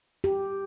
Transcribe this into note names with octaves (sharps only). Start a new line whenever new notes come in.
G4